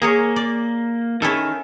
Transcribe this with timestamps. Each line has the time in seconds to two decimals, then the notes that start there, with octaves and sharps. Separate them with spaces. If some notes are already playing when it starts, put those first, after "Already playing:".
0.02 A#3 G#4 A#4 C#5
0.36 D5
1.22 D#3 C#4 E4 A4